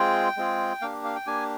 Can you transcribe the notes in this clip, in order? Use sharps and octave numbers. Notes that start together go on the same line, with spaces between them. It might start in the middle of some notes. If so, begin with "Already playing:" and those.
Already playing: G#3 C4 F4 G#4 G5
G#3 C4 F4 G#4
A#3 D4 G4 F5
F5
G5
A#3 D4 G4 G#5